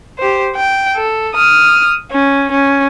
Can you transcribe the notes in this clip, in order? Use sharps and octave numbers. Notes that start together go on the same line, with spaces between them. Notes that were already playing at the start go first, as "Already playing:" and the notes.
G4 C5
G5
A4
D#6 F6
C#4
C#4